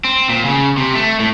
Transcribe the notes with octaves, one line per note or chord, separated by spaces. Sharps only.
C4
A#2
C#3
C3
A3
A2